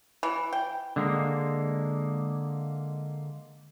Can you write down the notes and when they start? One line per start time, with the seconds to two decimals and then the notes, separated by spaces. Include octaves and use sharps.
0.23 E3
0.53 G5
0.96 D3 G#3 A#3